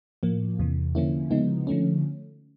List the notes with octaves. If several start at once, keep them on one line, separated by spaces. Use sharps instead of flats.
A2 F3 A#3
E2 C3 E3
D3 F3 A#3 C#4 E4
C#3 F3 G#3 B3 D#4
D3 F3 A3 C#4